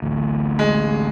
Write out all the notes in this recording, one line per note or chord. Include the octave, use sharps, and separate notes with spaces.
A1 D2
G#3